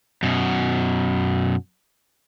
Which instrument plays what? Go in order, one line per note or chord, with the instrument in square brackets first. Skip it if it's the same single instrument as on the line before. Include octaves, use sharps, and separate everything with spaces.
[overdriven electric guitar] F#2 B2